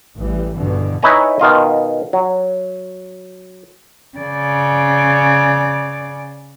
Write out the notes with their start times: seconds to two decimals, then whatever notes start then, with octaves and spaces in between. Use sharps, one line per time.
0.15 A1 E3 G3
0.55 G2 B2 D3 E3
1.03 D#4 E4 B4 C#5 G#5 A#5
1.40 B2 D#3 F4 D#5
2.13 F#3
4.18 C#3 D5